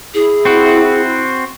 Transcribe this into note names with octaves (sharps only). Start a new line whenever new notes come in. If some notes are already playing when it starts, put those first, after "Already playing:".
E4 G#4
C4 F#4